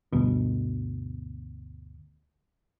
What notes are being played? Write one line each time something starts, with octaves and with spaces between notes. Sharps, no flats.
G1 D2 B2